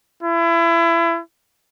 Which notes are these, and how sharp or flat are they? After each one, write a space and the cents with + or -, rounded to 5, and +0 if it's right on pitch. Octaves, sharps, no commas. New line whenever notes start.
E4 +30